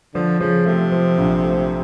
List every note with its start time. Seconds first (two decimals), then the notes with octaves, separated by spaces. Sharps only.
0.15 D3 F3
0.40 C#3 F3
0.66 C3 A3
0.92 F3
1.18 A#1
1.43 A3